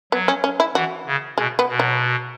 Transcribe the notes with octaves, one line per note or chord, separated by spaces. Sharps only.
F#3 B3
C#4
C#4
E4
E3 F#4
C#3
B2 G#3
B3
B2
F#3